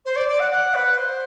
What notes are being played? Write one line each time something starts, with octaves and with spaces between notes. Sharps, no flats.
C5
D5
D5
F#5
F#5
B4
C5